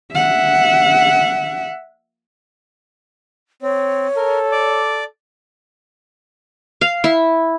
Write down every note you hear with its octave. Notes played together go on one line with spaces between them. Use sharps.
E5 F#5
C4 C#5
A4 A#4
D5 D6
F5
E4